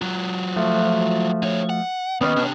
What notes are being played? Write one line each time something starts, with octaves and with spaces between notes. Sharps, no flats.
F#3 F4
F3 A3 F#4
D3 C#5
F#5
D#2 B3 C#4 D#5
C3 D4